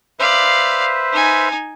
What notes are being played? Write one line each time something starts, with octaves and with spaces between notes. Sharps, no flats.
B4 C5 D5 E5 F5
D#4 G#5